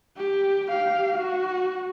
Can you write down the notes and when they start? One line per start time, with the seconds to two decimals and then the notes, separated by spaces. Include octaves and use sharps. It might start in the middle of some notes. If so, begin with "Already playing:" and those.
0.17 G4
0.69 G4 F5
1.18 F#4